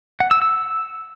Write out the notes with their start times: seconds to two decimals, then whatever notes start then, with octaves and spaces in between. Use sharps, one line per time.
0.20 F#5
0.31 E6
0.42 E6